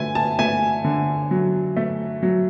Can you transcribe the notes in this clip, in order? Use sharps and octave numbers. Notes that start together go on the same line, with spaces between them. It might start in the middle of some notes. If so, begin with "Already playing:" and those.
Already playing: D3 A3 G#5
A5
A3 G#5
D3
F#3
A3
F#3